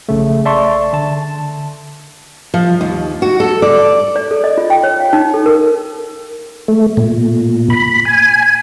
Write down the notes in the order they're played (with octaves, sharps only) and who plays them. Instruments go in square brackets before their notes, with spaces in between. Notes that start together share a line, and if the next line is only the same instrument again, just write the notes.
[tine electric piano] A#1 C#3 A3
D5 E5 A5 C6 C#6
D3 A5
[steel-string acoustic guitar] F3
D#2
F#4
A4
D5
[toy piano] D5
A4
D#5
F4
G5
C#5
F5
D#4
A4
A#4
[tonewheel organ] A3
A#2
B5
G#5